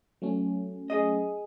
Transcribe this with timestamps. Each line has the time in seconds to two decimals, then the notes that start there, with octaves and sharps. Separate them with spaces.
0.22 F#3 A3 C#4
0.90 G#4 D#5